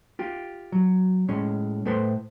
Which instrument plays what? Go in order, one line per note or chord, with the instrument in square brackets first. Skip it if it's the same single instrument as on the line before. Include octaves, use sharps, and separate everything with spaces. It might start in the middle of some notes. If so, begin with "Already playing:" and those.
[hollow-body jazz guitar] F4 G4
F#3
A2 G#3 C#4
A2 A3 A4 B4 C5 C6